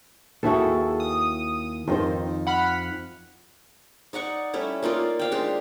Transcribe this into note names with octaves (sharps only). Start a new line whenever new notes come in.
D#2 E4 F#4 G#4 A4
D#6
F2 D#3 D#4 C5
F#5 B5 F6
D#4 D5 F#5 C#6
G3 A3 C#4 E4
A#3 D#4 F4 D5
C5 F5 G5
G#3 D4 G4